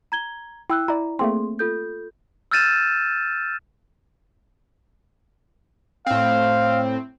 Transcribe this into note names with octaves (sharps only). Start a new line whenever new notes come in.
A#5 G#6 G7
E4 G5 E6 F#6
E4 D5 A#5
A3 A#3 C4 G#4 C6
F4 A4 G6
E6 F6 G6 A6 D#7 E7
A2 C4 F5